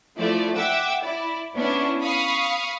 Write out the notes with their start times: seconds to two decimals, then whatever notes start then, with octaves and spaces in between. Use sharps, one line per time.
0.17 F3 A3 E4 D5
0.56 E5 F#5 G5 D6 E6
1.00 E4 D5
1.54 B3 C#4 D4 E4
2.01 F5 B5 C#6 D#6